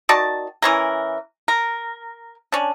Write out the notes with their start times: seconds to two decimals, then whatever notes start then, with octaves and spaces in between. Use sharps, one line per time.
0.09 D#3 F#4 D5 A5
0.62 E3 C#4 A#4
1.48 A#4
2.52 C#4 D4